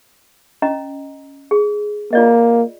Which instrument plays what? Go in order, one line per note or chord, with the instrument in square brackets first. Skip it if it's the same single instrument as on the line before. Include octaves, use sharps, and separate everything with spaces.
[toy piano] C#4 D#5 A#5
G#4
[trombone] A#3 [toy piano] F4 D5 D#5